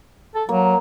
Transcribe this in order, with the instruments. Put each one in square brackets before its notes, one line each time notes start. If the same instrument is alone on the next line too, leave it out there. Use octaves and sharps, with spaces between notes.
[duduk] A4
[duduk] F#3 [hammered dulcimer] A#3